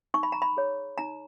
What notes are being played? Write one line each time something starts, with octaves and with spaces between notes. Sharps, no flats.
D#4 C#6
B5
A#5
B5
G#4 C#5
D#4 A#5